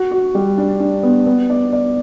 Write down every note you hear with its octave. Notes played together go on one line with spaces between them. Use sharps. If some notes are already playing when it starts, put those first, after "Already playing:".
Already playing: F#4
F#4
G3
D4
D4
B3
B3
D5
D5